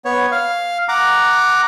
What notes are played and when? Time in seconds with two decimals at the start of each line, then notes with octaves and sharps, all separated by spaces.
0.05 B3 C#5
0.32 F5
0.89 F#5 A#5 D6